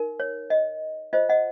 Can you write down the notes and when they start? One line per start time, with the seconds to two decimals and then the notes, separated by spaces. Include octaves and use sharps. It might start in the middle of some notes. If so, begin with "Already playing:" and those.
Already playing: D#4 A#4
0.20 C#5
0.50 D#5
1.13 F4 C5 D#5
1.29 D#5 F#5